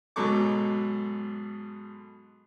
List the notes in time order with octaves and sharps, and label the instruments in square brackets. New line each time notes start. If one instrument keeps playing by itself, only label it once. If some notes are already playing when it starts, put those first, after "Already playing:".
[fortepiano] G#2 B2 F#3 A4 C#6 D6